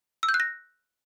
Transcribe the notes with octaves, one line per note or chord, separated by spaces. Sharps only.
E6
G6
F#6
A#6